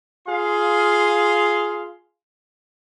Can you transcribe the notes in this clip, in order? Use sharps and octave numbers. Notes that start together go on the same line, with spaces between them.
F4 G#4 F5 C6